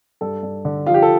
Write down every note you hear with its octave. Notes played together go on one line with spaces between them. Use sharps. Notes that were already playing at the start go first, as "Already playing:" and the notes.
G2 A4
G2
D3
F3 F4
G4
A4